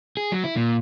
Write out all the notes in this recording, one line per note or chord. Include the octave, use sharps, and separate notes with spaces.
G#4
F#3
E4
A#2